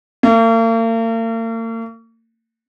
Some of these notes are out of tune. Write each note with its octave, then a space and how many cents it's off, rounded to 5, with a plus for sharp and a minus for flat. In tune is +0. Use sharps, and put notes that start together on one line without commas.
A#3 -45